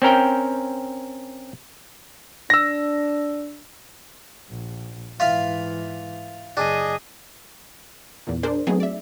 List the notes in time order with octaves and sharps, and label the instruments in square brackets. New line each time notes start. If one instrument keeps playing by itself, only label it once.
[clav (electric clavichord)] C4 C#4 A#4 G5
[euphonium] D4 [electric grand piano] E6 A#6
[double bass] A#1
[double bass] G#2 E3 [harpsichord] F4 E5 F5
[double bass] F#1 [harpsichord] D4 [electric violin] G#4 D#5
[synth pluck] E2 A#2
D4 G#4 A#4 C5 D5
F#3 A3 B3 C4 D#4 G#4
D5 E5